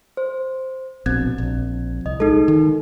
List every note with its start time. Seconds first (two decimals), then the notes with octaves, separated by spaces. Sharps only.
0.17 C5
1.06 A#1 B2 C4 G#6
1.38 A#1
2.06 C2 D#5
2.20 G#3 D#4 A4
2.48 D#3